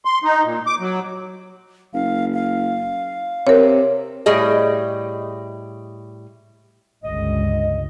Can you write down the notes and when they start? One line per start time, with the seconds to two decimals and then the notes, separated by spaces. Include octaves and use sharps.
0.05 C6
0.24 D#4
0.44 A#2
0.66 D6
0.80 F#3
1.94 F#1 F5
2.34 F5
3.47 C3 A#4 C#5
4.26 A2 G3 G#4 D#5
7.04 G1 C#2 G2 D#5